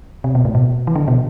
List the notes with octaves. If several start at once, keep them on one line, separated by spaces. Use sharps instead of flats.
C3
B2
A2
B2
E3
D3
B2